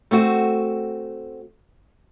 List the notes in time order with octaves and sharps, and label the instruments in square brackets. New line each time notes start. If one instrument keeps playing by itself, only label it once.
[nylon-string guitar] A3 C4 F#4